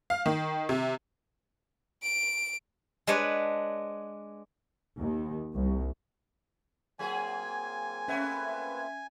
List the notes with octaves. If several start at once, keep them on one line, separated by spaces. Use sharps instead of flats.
F5
D#3
C3
D7
G#3 D4 B4 C#5
D#2
C2
F#3 A#3 C4 F4 G#4 G#5
A3 B3 C#4 E5 G#6